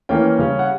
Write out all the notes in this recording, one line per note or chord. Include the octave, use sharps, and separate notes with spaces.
E3 A#3 C#4 G5
C#3 G3 C#4
F#5